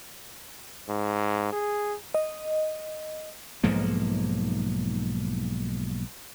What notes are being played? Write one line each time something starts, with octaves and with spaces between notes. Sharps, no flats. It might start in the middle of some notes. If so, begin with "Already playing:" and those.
G#2
G#4
D#5
B1 G#2 F3 A#3